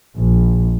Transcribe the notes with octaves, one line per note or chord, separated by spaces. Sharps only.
A#1